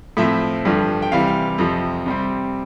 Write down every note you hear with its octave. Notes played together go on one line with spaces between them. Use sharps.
A2 F3 C4 E5
G2 D3 F3
G5
C3 E3 G3 F5
F5
F2 C3 F3
C3 G3 C4